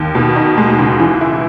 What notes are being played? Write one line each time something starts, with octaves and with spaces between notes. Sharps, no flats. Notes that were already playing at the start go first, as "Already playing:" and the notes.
Already playing: D#2
B2
D#4
G#3
C#2
E3
E4